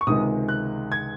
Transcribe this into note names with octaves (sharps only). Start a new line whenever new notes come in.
C#6
C#2 C3 D#3 G#3 D#6
F#6
G#6